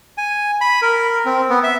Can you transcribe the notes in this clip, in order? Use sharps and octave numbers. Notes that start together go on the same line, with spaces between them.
G#5
B5
A#4
C4
B3
E5